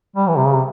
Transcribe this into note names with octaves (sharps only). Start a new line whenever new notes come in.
G3
E3
C3
C#3
C3